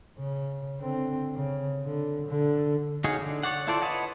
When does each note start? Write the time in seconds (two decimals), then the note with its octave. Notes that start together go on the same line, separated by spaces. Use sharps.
0.18 C#3
0.79 D3 C4
1.35 C#3
1.85 D3
2.27 D3
3.04 D#4 F#4 G#4 C#5 F5
3.20 D3
3.43 C#5 D5 F#5
3.67 E4 F4 A4 C5 D5
3.82 B4 C#5 D#5 F#5 A5